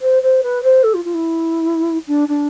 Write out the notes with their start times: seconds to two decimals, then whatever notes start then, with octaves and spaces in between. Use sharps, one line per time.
0.01 C5
0.22 C5
0.43 B4
0.63 C5
0.83 A4
0.94 F4
1.05 F4
1.14 E4
2.07 D4
2.28 D4